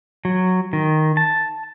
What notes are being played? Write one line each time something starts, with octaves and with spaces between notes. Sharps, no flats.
F#3
D#3
A5